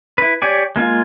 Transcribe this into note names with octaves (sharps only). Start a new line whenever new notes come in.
E4 B4
G4 C#5 D5 G#5
G#3 A#3 F4 G#5